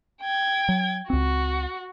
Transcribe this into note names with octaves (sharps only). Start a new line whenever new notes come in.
G5 G#6
F#3
C#2 C4 F#4